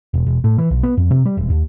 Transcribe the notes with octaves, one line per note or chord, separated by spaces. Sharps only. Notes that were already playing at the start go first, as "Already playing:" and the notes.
E1
E1
A2
E3
B1
B3
F2
C3
G3
E1
D#2